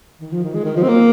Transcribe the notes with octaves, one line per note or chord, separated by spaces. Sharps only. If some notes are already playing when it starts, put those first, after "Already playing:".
D#3
F3
D#3
G#3
D#3
F3
C4
A#3